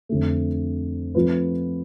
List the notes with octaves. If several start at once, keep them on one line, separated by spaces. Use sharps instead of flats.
F2 D3 A3
F3 A3 C4 F4 B4